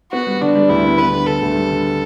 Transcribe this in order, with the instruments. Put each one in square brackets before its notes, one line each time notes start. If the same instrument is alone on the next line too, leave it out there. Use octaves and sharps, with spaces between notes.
[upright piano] B3 [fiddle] F#4
[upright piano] G3
[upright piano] D3 [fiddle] D4
[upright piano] G3
[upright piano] D2 [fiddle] E4
[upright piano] B3
[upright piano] B3 [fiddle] B4
[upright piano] D3
[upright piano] D3 [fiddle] A4
[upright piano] D2
G3
D3